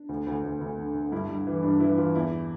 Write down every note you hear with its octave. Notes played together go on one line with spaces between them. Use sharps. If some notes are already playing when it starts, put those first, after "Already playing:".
Already playing: D4
D2
D2
D2
D2
D3
D3
G2 E4
G2
E3
G2 D4
E3 E4
E3 F4
E2 E4